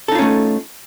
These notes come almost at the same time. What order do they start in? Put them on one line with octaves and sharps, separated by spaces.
A4 D#4 F4 C#4 A3